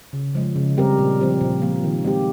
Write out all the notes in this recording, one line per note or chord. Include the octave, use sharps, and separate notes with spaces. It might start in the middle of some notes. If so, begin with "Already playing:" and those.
C#3
F3 G#3
C#3
G3 C4 G4 A#4
A#2
F3 C4 G4
A#2
F3 A#3
D#3
G#3 C4 G4